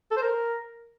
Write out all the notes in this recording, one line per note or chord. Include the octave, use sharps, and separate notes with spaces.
A4
C5
A#4